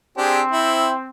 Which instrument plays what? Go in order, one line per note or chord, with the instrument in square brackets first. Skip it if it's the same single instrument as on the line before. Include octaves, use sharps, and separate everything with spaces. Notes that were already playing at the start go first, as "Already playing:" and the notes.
[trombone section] C4 [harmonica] D4 G4 G#4
[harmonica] E4